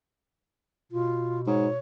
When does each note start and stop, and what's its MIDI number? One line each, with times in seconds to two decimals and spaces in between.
0.92 1.78 47
0.92 1.41 65
1.47 1.67 44
1.47 1.79 73